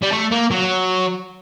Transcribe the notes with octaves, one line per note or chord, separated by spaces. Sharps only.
G3
A3
A#3
F#3